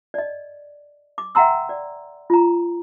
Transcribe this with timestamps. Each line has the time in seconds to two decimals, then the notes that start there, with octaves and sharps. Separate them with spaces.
0.14 D5 D#5
1.18 D6
1.35 E5 F#5 G5 A#5 C6 E6
1.69 D5
2.30 F4 A#5